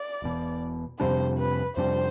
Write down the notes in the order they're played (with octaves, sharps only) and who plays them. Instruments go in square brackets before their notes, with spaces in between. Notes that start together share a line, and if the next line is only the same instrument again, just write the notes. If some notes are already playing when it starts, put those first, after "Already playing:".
Already playing: [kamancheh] D5
[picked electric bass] E1 E2 B2
[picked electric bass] F2 C3 G3 D4 [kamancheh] C5
[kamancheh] B4
[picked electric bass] F2 C3 G3 D4 [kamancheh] C5